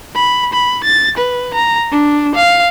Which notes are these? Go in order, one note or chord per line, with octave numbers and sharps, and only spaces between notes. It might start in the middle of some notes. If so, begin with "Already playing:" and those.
B5
B5
A6
B4
A#5
D4
F5